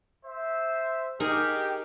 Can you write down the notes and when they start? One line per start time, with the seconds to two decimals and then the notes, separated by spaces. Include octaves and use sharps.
0.25 C5 E5
1.20 D#4 G4 G#4 A#4